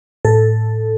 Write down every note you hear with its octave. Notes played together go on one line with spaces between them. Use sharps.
A2 A4